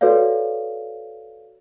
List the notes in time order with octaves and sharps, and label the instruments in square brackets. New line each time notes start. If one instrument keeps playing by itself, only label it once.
[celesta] F#4 A4 B4 C#5 D5 F5